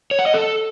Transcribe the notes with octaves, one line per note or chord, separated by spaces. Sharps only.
C#5
F#5
D#5
A4